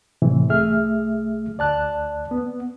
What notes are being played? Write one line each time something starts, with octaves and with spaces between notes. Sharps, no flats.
A2 C3 E3
C2 A3 G#4 E5 F6
D2 D5 A5 F#6
B3